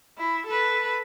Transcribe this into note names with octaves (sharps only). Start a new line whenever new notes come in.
E4
A4 B4